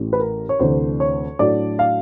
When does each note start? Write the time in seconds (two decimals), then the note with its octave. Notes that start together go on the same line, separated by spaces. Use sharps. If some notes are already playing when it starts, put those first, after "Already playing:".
Already playing: A1 A2 E3
0.13 B4
0.20 A#4
0.49 C#5
0.59 D2 C3 E3 A3 D4 C5
1.00 C#5
1.39 A2 F#3 A3 D4 D5
1.79 F5